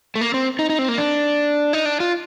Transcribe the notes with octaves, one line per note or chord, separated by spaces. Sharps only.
A3
A#3
C4
D#4
D#4
C4
A#3
D4
D#4
D4
F4